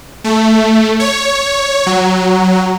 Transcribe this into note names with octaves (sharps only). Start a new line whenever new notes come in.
A3
C#5
F#3